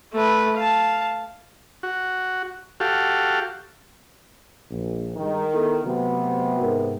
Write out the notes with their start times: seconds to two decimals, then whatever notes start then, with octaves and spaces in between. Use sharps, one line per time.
0.13 A3 B4
0.56 F5 A5
1.83 F#4
2.80 F#4 G4 A4 F5
4.69 A#1
5.16 G2 D#3 G#3
5.53 B3 E4 A4
5.84 C3 F#3 A3 B3 F#4
6.60 G#2 A#4